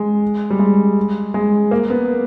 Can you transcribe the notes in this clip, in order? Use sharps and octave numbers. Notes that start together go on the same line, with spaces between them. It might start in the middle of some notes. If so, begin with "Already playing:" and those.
Already playing: G#3
G3
G#3
G#3
A#3
B3